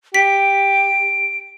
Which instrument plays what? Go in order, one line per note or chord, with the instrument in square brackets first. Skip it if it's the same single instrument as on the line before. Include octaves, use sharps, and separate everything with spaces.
[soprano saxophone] G4 [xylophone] B6 [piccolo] D7